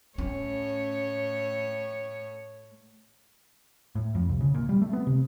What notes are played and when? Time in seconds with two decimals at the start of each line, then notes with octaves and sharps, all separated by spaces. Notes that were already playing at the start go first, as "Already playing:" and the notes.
0.18 A2 C#4 C#5
3.95 A2
4.15 F2
4.29 C2
4.41 C#3
4.54 A#2
4.69 G3
4.82 A3
4.93 B3
5.07 C3